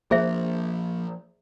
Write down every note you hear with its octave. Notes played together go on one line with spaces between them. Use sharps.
F3 A#3 G#4 C5 E5